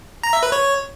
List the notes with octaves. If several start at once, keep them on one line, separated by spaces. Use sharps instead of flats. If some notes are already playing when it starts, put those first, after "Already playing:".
A#5
E5
B4
C#5